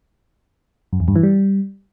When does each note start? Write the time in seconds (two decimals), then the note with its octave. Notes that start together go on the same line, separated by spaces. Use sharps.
0.93 F#2
1.00 E2
1.08 G2
1.16 E3
1.23 G3